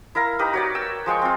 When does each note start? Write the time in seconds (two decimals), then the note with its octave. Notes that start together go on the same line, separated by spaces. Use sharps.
0.15 E4 A#4 F5 A#5
0.39 D#4 G4 A#4 B4
0.53 F#4 C#5 D5
0.75 G5 E6
1.06 F3 G#3 G5 C#6
1.22 C4 F4